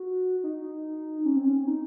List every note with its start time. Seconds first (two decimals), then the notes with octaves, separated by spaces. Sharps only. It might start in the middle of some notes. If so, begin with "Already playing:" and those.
Already playing: F#4
0.43 D#4
1.25 C#4
1.36 C4
1.46 C#4
1.67 D#4